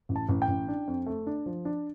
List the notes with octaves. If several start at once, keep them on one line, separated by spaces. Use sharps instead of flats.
A1
A5
A1
G5
A1
D4
F2
A3
D4
F3
D4